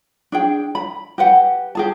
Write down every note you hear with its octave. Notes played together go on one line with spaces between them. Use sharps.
D4 G#4 G5
B5
G4 B4 F#5
G4 G#4 A5